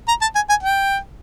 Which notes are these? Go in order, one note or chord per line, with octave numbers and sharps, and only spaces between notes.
A#5
A5
G#5
G#5
G5